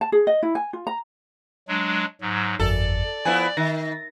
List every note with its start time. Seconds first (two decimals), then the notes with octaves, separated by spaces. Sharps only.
0.01 A5
0.12 G#4
0.27 D#5
0.43 E4
0.55 G#5
0.73 F4
0.87 A#5
1.68 F#3 G#3 D4
2.21 G#2 F#3
2.59 G1 F2 A4 D5
3.25 F3 B3 E4 G#5
3.57 D#3 E5 A6 A#6